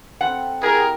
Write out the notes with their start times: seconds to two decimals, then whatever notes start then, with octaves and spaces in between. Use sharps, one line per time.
0.21 C4 A4 F#5 B5
0.62 E4 G4 G#4 A#4